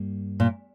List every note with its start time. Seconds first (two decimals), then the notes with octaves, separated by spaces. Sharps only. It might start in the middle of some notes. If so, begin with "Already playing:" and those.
Already playing: G2 G3 A#3
0.40 A#2